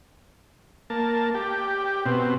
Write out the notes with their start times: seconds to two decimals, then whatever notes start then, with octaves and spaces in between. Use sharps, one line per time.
0.90 A#3 A5
1.35 G4
2.06 B2 C4